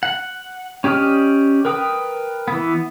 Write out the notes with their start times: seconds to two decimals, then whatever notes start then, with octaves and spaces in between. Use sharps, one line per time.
0.03 F#5
0.84 C#4 G4 D5 D#5 F6
1.65 A#4 B4 G5 D#6
2.48 E3 B3